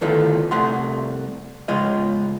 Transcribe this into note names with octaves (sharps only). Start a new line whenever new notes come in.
D2 A2 D#3 F4 A4 B4
C2 A3 F#5 C6
G#2 C#3 G#3 F4 D#5